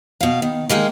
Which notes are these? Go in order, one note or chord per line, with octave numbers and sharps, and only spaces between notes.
B2 F5
D#3
D#3 G#3 A#3 D#4